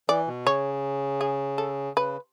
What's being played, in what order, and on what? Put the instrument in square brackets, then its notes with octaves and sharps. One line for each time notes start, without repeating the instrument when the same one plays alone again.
[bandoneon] E3 [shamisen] D5
[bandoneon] B2
[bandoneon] C#3 [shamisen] C#5
[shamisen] G#4
A4
[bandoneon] C#3 [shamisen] B4